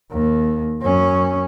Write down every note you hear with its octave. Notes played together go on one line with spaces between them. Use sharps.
D#2
F#2 C#4